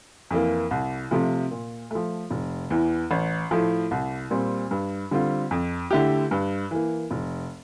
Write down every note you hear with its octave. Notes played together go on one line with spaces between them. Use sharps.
F2 E3 A#3
C2
C3 F3 A3
A#2
F3 A3
F1
E2 E3
A1
A2 F3 A3
C2
A#2 G3 C4
G2
D3 G3 C4 F4
F2
D3 A3 E4 G4
G2
E3 A#3
F1